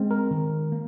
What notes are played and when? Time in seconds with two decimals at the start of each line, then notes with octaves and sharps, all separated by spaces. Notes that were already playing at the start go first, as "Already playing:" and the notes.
Already playing: G#3 C4
0.11 A#4
0.31 D#3
0.72 A#3